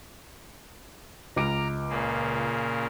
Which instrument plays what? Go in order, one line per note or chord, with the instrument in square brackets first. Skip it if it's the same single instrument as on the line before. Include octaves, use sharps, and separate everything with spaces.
[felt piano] C#2 D6 D7 [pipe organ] A#5 F6
[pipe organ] A#2 C#3 A#3